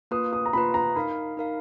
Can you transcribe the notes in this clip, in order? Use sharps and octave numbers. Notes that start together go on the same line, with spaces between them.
A#3 F4 B4 D#6
D#6
A#5
A#3 F4 B4 B5
A#5
D#4 A#4 F5 B5
D#4 A#4 F5